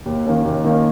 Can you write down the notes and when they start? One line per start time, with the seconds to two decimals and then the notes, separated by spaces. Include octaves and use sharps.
0.06 D#2
0.26 D#3 A#3 C#4
0.45 D#2
0.64 D#3 A#3 C#4